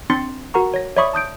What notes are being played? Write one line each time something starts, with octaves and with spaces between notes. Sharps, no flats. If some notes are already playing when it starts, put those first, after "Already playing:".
C4 D4 C6 A6 C#7
F#4 A#4 F#5 A#5 C#6
C#5 A#6
C#5 D5 E5 B5 C#6 D#6
A5 D#6 G6 D7